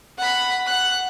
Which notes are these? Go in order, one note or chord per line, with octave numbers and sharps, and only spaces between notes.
F#5 B5
F#5 F#6